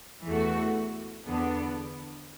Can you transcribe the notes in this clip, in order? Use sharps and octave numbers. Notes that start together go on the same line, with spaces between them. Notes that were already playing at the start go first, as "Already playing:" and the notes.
E2 E3 A3 F#4
E2 D3 B3 D4